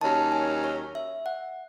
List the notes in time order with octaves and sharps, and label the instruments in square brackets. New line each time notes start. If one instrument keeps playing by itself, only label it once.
[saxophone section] D#2 D#3 F#3 C#4 [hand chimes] A5
[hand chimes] G#5
C#5
E5
F#5